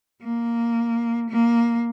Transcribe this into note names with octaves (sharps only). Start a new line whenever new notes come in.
A#3
A#3